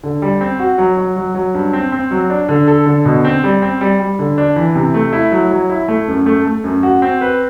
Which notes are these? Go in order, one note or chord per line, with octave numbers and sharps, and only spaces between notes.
D3
G3
C4
F#4
F#3
F#3
F#3
F#3
G2
C4
C4
F#3
D4
D3
A4
D3
B2
C4
G3
C4
G3
G3
D3
D4
E3
C3
A3
E4
F#3
F#3
E4
A3
F#2
A3
A3
F#2
F#4
C4
B4